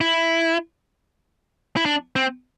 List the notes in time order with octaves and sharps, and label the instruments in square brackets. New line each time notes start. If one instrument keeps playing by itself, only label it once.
[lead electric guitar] E4
E4
D4
C4